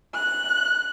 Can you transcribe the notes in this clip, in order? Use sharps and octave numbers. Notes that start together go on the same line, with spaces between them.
F#6